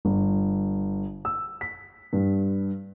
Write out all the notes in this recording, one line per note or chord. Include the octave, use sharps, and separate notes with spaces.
G1
E6
B6
G2